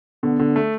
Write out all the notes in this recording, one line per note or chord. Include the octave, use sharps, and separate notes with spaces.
D3 B3
D3
A3